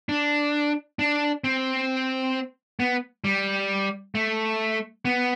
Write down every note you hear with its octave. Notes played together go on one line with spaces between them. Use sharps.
D4
D4
C4
B3
G3
A3
B3